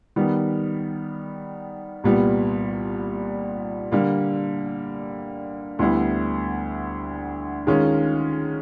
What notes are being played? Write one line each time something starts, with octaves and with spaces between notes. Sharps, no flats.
D#3 G3 B3
C2 A#2 G3 B3
D3 G3 A#3
D2 D3 G3 B3 E4
D#3 G#3 C#4 F4